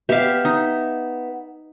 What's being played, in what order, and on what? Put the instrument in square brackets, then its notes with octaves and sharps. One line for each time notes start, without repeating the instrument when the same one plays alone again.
[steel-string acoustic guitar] B3 E5 [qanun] G4 F5
[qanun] D#4